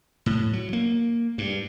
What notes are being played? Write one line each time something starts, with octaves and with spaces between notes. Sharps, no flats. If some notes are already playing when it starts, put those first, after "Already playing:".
A2
F#3
A#3
G2